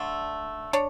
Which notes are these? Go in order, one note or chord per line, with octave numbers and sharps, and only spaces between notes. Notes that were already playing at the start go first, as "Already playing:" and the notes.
Already playing: D3 A3 D4
D4 C#5